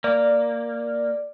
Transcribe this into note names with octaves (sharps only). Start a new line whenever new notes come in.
A#3 D5